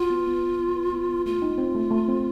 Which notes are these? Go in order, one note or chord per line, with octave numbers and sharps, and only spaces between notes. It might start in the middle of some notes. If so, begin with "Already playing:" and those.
Already playing: F4 F#4
B3
B3
B3
B3
B4
B3
B3
A3 F4
D#4
C4
A3
A3
C4